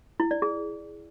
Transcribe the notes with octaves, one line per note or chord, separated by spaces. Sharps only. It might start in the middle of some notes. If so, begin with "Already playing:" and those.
E4
D5
G#4